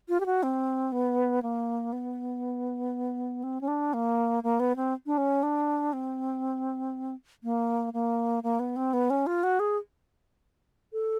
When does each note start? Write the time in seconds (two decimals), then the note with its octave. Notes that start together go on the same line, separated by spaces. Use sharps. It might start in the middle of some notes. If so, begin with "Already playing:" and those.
0.09 F4
0.20 G4
0.26 F#4
0.43 C4
0.92 B3
1.42 A#3
1.93 B3
3.44 C4
3.61 C#4
3.68 D4
3.94 A#3
4.43 A#3
4.60 B3
4.76 C4
5.06 D4
5.18 C#4
5.43 D4
5.93 C4
7.43 A#3
7.93 A#3
8.43 A#3
8.60 B3
8.76 C4
8.93 B3
9.10 C#4
9.27 F4
9.43 F#4
9.60 G#4
10.93 A4